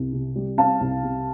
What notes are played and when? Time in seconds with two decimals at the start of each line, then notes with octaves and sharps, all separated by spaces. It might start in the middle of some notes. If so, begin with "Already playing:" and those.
Already playing: C2
0.13 C3
0.36 G3
0.57 C4 F5 A5
0.81 C2
1.03 C3